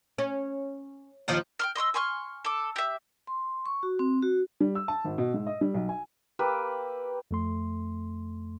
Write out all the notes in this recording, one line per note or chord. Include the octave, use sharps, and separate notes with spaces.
C#4
D#2 D#3 F3
G5 C6 F6
D#5 C6 C#6 E6
G#5 C6 C#6 F6
A4 D6
G4 E5
C6
C#6
F#4
C4
F#4
G3
E6
A5
G#1
B2
G#2
D#5
G3
B1
G#5
A#3 G4 B4 E6
F2 A3 C6